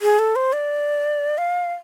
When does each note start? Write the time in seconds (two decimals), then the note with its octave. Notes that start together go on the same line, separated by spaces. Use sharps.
0.02 G#4
0.19 A4
0.36 C5
0.53 D5
1.38 F5